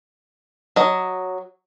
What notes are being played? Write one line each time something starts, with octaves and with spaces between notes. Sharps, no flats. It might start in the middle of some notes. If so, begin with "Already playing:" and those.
F#3 D#5